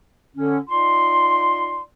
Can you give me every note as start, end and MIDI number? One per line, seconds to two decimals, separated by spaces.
0.36 0.58 50
0.36 0.58 61
0.68 1.81 63
0.68 1.81 65
0.68 1.81 74
0.68 1.81 84